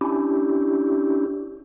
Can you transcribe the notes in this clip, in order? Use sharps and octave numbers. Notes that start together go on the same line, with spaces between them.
C#4 D4 E4 G4